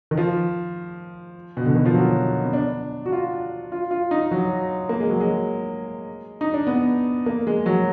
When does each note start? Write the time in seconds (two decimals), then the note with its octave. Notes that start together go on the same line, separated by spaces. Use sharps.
0.11 D#3
0.17 F3
1.57 B2
1.65 D3
1.75 D#3
1.85 F3
1.94 F#3
2.45 B3
2.53 D4
3.06 F#4
3.12 F4
3.72 F4
3.91 F4
4.11 D#4
4.31 F#3
4.89 A#3
5.00 G#3
5.09 F#3
5.20 G#3
6.41 D#4
6.54 D4
6.67 B3
7.26 A#3
7.47 G#3
7.66 F#3